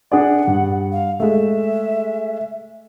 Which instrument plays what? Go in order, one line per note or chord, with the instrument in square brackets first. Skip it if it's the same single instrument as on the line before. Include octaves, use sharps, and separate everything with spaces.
[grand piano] D4 G#4 D5 [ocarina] F#5
[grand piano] G2
[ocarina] F5
[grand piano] G#3 A3 [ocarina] E5